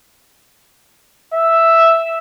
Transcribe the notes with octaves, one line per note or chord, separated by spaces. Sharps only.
E5